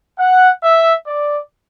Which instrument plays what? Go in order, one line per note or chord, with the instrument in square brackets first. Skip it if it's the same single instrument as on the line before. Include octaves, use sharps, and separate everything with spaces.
[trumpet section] F#5
E5
D5